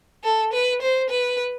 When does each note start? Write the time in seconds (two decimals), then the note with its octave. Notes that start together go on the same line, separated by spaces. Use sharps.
0.24 A4
0.53 B4
0.82 C5
1.10 B4